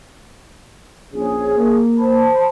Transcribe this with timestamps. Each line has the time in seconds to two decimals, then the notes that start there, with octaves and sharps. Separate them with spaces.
1.13 A#1 C#4 G#4
1.57 A#3
1.99 C5 A5 B5